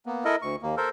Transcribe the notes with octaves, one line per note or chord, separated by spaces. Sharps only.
A#3 B3
E4 A4 A#4 D#5
D2 C#6
D#2 A#3
A4 A#4 C5